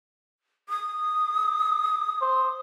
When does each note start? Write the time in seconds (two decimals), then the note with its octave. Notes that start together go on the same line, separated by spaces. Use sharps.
0.69 D#6
2.22 C5